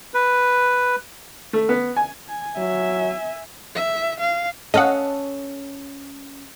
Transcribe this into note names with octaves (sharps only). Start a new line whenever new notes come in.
B4
A3
B3
G#5
G#5
F#3 E5 G#5
E5
F5
C#4 A4 D#5 F5 F#5